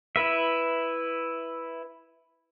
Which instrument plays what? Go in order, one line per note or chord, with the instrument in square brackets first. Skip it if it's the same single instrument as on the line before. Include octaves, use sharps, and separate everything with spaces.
[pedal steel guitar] E4 B4 E5